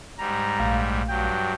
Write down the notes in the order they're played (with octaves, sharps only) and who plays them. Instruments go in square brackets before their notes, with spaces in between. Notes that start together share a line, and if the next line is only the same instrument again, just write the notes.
[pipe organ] G#2 G3 [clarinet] A#5
[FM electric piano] A#1 A3 F5
[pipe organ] G2 F#3 [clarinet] G5